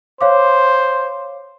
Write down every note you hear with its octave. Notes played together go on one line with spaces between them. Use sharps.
C5 C#5 F5 D6